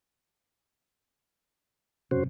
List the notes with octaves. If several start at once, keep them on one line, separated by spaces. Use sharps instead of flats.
E1 F#2 C3 C#4 F#4 C5